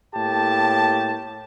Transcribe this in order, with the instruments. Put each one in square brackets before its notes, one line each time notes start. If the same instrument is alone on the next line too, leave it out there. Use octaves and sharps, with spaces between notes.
[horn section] A2 A#3 G4 A5